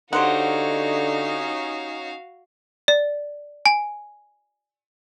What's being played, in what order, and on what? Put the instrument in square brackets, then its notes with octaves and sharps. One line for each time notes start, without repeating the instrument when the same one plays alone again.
[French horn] D3 [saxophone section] C#4 D#4 [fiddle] F#4 F5 [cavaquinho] G4 C5 F#5
[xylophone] D5
G#5